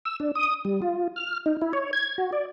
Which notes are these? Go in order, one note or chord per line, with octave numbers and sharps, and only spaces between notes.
E6
D4
D#6
G3
F4
F6
D#4
E4
C#5
G#6
F#4
D5